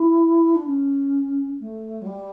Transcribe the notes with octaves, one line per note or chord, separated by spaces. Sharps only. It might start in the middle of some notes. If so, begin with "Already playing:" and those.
Already playing: E4
D4
C#4
A3
F#3
G3